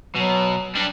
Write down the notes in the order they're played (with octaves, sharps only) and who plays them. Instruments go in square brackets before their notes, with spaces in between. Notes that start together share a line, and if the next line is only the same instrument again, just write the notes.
[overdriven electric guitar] B2 [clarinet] F#3
[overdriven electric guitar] G3 D4